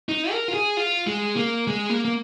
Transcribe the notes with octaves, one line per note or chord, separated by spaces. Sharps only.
D#4
A#4
F4
G#4
F4
G#3
A#3
G#3
A#3
A#3